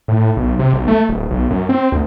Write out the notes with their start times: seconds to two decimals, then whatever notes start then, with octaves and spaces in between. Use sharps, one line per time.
0.08 A2
0.37 B1
0.59 C3
0.74 B1
0.88 A3
1.09 D1
1.31 B1
1.50 F#2
1.69 C4
1.92 D2